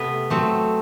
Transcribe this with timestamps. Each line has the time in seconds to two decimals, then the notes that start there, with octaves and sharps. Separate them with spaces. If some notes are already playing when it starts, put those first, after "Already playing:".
Already playing: C3 A3 B3 B4
0.30 F#3 A3 C4